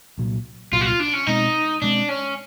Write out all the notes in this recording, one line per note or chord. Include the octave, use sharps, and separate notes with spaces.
C2 A#2 F#3
C2 A#2 F#3 F4
F#4
F4
D4
C#4
B2 G#3 C4 D#4
B2 G#3 C4 D4
C#4